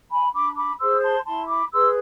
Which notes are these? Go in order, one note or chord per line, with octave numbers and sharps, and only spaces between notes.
G#5 B5
D4 B5 D6
B5 D6
G#4 C5 C6 E6
A5 C6
E4 A5 C6
B5 D6
G#4 B4 C6 E6